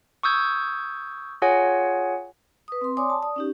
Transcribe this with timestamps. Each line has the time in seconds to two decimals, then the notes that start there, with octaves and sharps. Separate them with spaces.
0.23 C#6 D#6 E6 G6 G#6
1.42 F4 G#4 C#5 F#5 G#5
2.68 B4 D#6
2.81 C4 C6
2.97 C#5 D5 G#5 C6 D6 D#6
3.10 A5
3.23 D5 D#6
3.36 C#4 D#4 G4